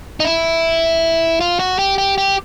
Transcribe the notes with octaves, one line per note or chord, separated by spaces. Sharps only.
D#4
E4
F4
F#4
G4
G4
G4